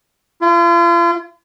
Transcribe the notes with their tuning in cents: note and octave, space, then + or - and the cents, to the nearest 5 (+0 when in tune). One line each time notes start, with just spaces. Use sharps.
F4 -40